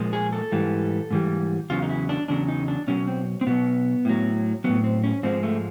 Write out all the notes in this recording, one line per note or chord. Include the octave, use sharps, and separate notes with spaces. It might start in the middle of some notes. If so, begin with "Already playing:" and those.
Already playing: A#2 F3 G#3
G#4
A4
G#2 E3 G3
G#2 E3 G3
E2 C#3 F#3 F4
D#4
E4
D4
E2 C#3 F#3 D4
D#4
D4
B2 F#3 C#4
C4
C4
B2 F#3 B3
A2 F#3
A2 F#3 B3
C4
C#4
G#2 F3 G#3 C4
A3